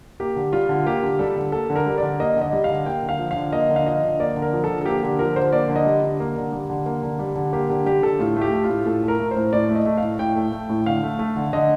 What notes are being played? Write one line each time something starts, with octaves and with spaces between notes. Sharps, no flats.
A#3 G4
D3
G3 F4
D3
A#3 G4
D3
G3 A4
D3
A#3 A4
D3
A#4
G3
D3 D5
A#3 D#5
D3 D#5
G3
F5
D3
A#3 G5
D3
F5
F3
F5
D3
A#3 D#5
D3
F5
F3 D#5
D3
A#3 D5
D3
A#4
F3
A4
D3
A4
A#3 G4
D3 G4
F3 A#4
D3 C5
A#3 D5
D3
D#5
G3
D3
A#3
D3
G3
D3
A#3
D3
G3
D3
A#3 G4
D3 G4
G3 G4
D3 A4
A2 F4
A3 G4
A3
F4
A2
A2 A4
A3 A#4
A3
C5
A2
A2 D5
A3
D#5
A3
F5
A2
A2 G5
A3
A3
A2
D3 F5
A3
A3
D3
D3 D#5